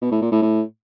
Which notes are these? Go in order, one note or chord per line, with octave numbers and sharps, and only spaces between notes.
B2
A2
A#2
A2
A2